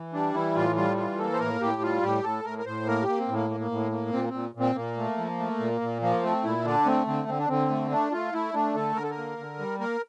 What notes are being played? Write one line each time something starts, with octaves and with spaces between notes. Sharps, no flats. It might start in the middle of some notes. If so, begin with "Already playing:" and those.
Already playing: E3
G3 D4
E3 E4
A2 F4
G3 F4
E3 F4
A#3 A4
C5
A2 A#4
A2 G4
G3 F4
A2 G4
A2 A4
A2 A#4
A#4
A2 C5
A#3 A#4
G4
A#3
C4
A2
A#3
A#3
A#3
A2
A#3
A#2 C4
A#3
A#2 C4
A#2
C4
A#2 A#3
A3
F3
A3
A#2
A#2
F3 A#3
A3 C4
A#2 E4
D3 D4
A3 C4
D3 C4
D3 C4
D4
D3 C4
A3
A3 D4
A3 F4
A3 E4
A3 D4
D3 A4
D3 A#4
A4
A#4
A#3
D3
G3
A#3 A#4